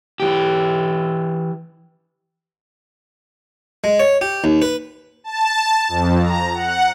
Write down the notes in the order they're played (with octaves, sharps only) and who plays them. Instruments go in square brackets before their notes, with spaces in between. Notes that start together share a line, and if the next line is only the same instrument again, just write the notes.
[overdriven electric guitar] E3 G4
[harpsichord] G#3
C#5
G4
D#2
B4
[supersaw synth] A5
F2
A#5
F#5